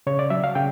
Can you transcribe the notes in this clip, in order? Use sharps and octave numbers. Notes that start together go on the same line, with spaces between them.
C#3 C#5
D5
F#3 E5
F5
C#3 G5